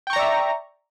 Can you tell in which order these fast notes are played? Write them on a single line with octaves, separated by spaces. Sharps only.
G5 C#6 A#5 D5 E5